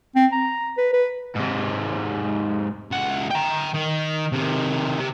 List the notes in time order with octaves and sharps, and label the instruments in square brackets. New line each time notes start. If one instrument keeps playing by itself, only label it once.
[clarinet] C4
A#5
B4
B4
[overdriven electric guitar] G#2 C3
[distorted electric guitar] C#2 F#5
G5 A#5
D#3
C3 D#3
C3